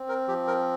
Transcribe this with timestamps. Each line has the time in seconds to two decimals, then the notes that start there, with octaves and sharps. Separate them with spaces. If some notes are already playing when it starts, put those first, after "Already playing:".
Already playing: C4
0.09 A#4
0.28 F3 G4
0.47 A#4